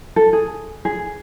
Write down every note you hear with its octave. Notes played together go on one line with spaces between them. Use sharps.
A4
G#4
G#4